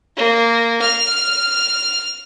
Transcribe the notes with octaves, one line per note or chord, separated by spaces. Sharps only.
A#3
F6